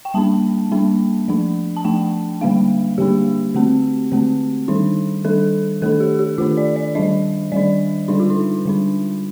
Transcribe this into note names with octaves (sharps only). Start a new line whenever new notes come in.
G5
G3 A#3 D4 A5
G3 A#3 D4
F3 A3 D4
A5
F3 A3 D4 G5
D3 G3 A#3 D4 F5
D3 G3 A#3 D4 G4
D3 A3 C4
D3 A3 C4
D#3 G3 D4 D#4
D#3 G3 D4 A4
D#3 A3 D4 A4
G4
G4
D#3 A3 D4 F4
D5
D5
D#3 G3 D4 D#5
D#3 G3 D4 D5
D3 G3 D4 D#4
F4
D#4
D3 G3 D4